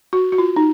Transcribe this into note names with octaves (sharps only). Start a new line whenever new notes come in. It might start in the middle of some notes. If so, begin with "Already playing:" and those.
F#4
F#4
F4
D#4